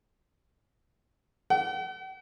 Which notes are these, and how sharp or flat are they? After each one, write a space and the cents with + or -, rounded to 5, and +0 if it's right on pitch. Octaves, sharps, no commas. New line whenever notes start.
F#5 +45